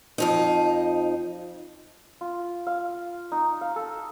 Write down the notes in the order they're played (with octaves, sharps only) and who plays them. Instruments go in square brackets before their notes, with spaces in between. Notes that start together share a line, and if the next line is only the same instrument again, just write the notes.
[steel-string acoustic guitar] F2 F3 D#4
[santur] F4
F5
D#4
F5
A4